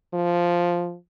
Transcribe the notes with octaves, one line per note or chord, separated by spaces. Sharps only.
F3